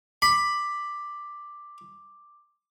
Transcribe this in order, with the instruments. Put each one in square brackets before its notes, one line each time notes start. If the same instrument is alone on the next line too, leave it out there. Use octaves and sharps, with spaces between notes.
[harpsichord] B5 [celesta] D6